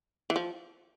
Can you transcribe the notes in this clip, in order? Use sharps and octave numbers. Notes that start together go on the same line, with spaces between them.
E3
F3